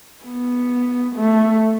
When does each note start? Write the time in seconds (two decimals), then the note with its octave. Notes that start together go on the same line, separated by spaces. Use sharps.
0.25 B3
1.15 A3